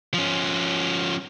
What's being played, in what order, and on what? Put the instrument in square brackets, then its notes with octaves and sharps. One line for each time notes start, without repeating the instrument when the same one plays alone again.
[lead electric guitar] F3 C#4